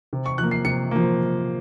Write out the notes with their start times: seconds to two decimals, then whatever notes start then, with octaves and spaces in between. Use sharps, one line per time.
0.13 C3
0.26 C#6
0.38 F3 A#3 F#6
0.51 C7
0.65 C3 C#7
0.91 F3 A#3